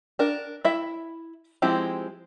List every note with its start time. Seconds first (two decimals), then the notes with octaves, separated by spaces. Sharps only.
0.19 D4 A#4
0.65 E4 E5
1.62 F3 G#3 C4 E4 G4